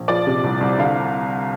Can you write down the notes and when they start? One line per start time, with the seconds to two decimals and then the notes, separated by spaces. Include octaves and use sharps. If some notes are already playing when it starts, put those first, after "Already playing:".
Already playing: A#1
0.08 F3 D5
0.27 C3
0.44 C2
0.61 C2
0.78 D3 F5